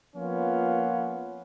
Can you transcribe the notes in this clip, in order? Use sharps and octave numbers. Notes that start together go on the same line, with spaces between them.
F3 A#3 B3 C#4 F4